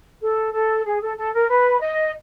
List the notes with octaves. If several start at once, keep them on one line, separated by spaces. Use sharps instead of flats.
A4
A4
G#4
A4
A4
A#4
B4
D#5